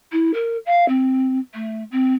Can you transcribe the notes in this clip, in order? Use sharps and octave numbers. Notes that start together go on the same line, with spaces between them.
E4
A#4
F5
C4
A3
C4